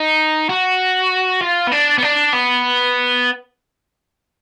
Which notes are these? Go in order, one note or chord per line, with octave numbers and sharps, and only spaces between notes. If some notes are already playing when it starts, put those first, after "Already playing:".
Already playing: D#4
F#4
F4
B3
D4
B3
D4
B3